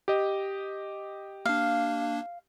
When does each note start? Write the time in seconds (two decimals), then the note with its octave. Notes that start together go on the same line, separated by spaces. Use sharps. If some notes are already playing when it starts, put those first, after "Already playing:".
0.08 G4 D#5
1.45 A#3 D4 F5